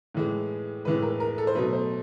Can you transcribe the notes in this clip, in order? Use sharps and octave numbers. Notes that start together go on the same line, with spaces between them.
A2 E3 G#3
A2 E3 G#3 B4
A#4
A#4
A4
C5
B2 F#3 A3 B4
C5